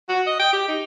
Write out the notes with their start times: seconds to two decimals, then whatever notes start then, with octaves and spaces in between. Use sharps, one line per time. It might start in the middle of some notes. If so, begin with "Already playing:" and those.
0.09 F#4
0.27 D#5
0.40 G5
0.53 G4
0.69 D#4